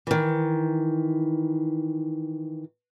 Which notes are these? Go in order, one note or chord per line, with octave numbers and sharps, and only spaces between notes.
D#3 E3